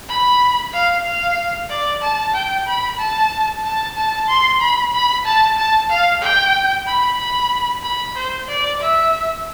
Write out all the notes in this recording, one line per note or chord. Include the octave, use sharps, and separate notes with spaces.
B5
F5
F5
D5
A5
G5
B5
A5
A5
A5
C6
B5
B5
A5
A5
F5
G5
B5
B5
B5
C5
D5
E5